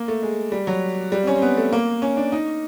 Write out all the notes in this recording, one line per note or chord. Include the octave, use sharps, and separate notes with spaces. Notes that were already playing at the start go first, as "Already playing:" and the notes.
Already playing: A#3
A3
G#3
G3
F#3
G3
C4
C#4
C4
B3
A3
A#3
C#4
D4
D#4